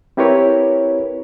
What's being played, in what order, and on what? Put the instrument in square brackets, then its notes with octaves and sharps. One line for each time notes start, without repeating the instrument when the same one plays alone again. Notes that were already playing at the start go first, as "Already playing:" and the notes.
[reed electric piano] C4 E4 G4 A#4 B4 C#5